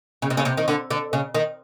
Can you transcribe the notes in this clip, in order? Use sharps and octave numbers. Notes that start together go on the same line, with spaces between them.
C#3
C3
C#3
C3
D#3
D3
D3
C#3
D#3